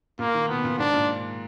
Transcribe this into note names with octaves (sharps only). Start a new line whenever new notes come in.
A#2 A#3
D#3
B2 B3
A#2
G#2 D4
A#2